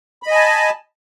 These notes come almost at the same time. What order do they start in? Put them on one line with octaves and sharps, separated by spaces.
B5 D#5 G#5 A5